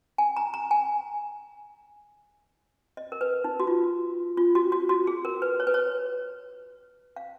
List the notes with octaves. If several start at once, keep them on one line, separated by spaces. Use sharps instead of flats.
G#5
A#5
A#5
G#5
D#5
A#4
B4
D#4
F#4
F4
F4
F#4
F#4
F#4
G#4
A#4
B4
C#5
B4
C#5
F5